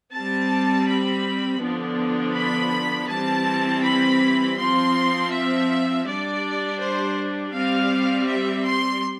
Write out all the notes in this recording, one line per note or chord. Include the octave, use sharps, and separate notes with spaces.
G3 C4 A5
B5
D3 F3 B3 D4
B5
E3 G3 C4 A5
B5
F3 C4 C6
E5
G3 D4 D5
C5
G3 C4 F5
E5
C6